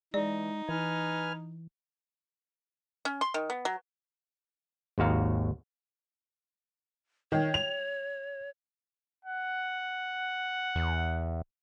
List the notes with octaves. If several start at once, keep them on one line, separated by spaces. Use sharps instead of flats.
E3 G#3 D#4 D5
E3 B4 G#5 F6
C#4
C6
D#3
B3
F#3
G#1 D#2 F#4 F5 A#5
D#3 C#5
F7
F#5
E2